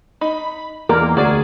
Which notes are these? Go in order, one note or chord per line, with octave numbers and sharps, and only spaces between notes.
D#4 B5
E2 A#3 G4 A#4 D5
D2 F#4 G#4 D5